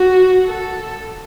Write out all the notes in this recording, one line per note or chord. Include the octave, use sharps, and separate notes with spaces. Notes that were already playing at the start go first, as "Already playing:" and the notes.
Already playing: F#4
A4